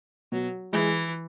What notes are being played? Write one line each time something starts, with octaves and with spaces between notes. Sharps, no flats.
B2 F#3
E3 G#3 E4 G#4